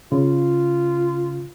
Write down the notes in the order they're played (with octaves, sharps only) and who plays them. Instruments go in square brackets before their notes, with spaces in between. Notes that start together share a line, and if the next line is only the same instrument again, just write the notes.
[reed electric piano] C#3 [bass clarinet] F4